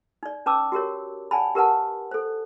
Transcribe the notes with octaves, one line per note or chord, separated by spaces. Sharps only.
D#4 D5
C#4 B4 A5 D6 E6
F#4 G4 A#4 C#5
D5 F#5 G#5 A5 B5
G4 A#4 B4 F#5 A5
A4 C5